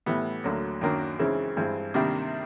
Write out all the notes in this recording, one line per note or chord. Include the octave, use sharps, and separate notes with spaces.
A2 E3 G3 B3
D2 D3 F#3 A#3
F#2 D#3 F#3 A#3 D4
C#3 E3 G#3 C4 D#4
G2 E3 G#3 C4
C3 D#3 G3 A#3 D4